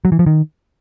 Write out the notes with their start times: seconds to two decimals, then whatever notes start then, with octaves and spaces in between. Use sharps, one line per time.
0.05 F#3
0.12 E3
0.19 F3
0.26 D#3